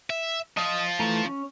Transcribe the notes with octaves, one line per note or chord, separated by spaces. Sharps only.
E5
F3 F4 D#5
E3 A3 A#5
C#4